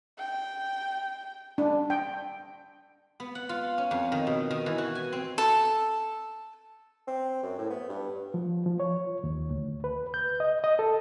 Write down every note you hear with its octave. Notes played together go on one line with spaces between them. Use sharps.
G5
D4
G5
B3
F#5
F4
C#4
F2
D#3
B2
D#3
E3
F#4
G#5
C4
A4
C4
F#2
A2
B3
G2
F3
F3
C#5
D#2
D2
B4
G6
D#5
D#5
A4